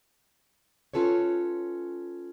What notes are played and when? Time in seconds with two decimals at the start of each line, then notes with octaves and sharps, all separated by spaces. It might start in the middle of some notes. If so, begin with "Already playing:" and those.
0.94 C#4 F4 A4 B4 C#5